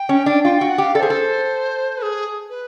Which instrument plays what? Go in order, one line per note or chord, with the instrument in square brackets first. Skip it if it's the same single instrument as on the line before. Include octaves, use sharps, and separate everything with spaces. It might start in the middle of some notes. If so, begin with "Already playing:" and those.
Already playing: [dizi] G5
[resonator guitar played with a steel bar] C#4
D4
[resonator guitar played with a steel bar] F4 [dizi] G5
[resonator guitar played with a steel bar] F#4 [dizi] G5
[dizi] F#5
[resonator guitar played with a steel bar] G4 [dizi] F5
[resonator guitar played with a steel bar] A4 [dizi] D5
[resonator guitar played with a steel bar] G#4 [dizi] C5
[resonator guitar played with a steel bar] A4
[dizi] B4
G#4
B4